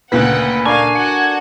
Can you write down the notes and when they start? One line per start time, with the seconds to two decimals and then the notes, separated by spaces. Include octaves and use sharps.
0.12 D2 A#2 C#3 B4 F#5 G5
0.65 D4 A4 A#4 F5 G#5 C#6
0.95 F#4 A4 F#5 C#7